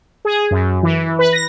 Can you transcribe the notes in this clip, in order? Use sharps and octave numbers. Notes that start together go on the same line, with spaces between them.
G#4
F#2
E3
B4
A#6